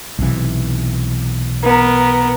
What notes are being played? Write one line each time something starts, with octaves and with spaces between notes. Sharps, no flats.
B1 C3 E3
B3 A#4